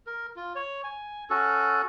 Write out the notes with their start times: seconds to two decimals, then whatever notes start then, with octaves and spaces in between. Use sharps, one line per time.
0.07 A#4
0.36 F4
0.56 C#5
0.84 G#5
1.30 C#4 F#4 A4